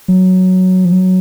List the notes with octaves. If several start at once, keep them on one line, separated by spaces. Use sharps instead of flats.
F#3
F3
F#3